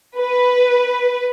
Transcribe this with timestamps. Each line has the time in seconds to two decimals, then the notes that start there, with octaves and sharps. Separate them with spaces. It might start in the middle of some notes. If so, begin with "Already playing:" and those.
0.18 B4